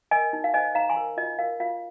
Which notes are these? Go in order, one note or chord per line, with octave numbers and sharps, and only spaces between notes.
A#4 D#5 G#5
D#4
F5
C5 D#5 G#5
D#4 F5 A#5
G#5 C6
A#4
F4 D#5
A#4 F5
F4 F5